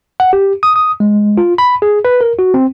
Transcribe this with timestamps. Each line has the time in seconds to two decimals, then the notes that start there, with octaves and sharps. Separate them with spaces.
0.20 F#5
0.33 G4
0.63 D#6
0.76 D#6
1.00 G#3
1.38 F4
1.58 B5
1.82 G#4
2.05 B4
2.21 A#4
2.39 F#4
2.54 C4